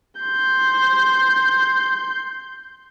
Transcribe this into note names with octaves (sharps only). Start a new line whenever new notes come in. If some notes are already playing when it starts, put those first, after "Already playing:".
C6 G6